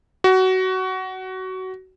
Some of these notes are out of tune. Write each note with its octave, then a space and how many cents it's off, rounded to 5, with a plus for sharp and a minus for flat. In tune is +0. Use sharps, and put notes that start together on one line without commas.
F#4 +20